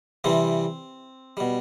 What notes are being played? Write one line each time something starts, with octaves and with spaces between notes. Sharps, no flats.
C3 E3 G3 C4
B2 G3